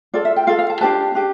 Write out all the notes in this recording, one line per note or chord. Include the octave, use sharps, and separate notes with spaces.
F4 A4 D5
E5
G5
F4 A4 F5
F5
A5
D4 G4 B4 A5
D4 G4